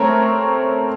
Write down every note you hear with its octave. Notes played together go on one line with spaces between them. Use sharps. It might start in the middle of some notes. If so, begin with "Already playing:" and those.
Already playing: A3 C4 A#4 C#5